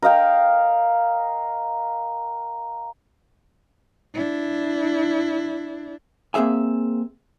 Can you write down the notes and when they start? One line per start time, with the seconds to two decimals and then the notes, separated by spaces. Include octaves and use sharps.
0.02 A#4 D#5 F5 G5
4.14 D4 E4
6.34 A#3 C4 G#4 E5 G#5